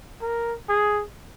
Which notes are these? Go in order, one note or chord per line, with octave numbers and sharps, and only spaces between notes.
A#4
G#4